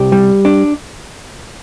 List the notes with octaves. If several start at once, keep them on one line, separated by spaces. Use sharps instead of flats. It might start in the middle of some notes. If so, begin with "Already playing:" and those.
Already playing: C2 G4
G3
D4